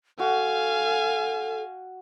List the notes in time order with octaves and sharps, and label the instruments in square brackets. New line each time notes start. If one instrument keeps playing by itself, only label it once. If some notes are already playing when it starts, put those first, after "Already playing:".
[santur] F#4 [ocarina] A4 [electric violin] F5 G#5